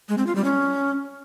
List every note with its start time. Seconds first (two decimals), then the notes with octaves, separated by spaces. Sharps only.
0.09 G#3
0.18 C4
0.27 F4
0.36 G3
0.44 C#4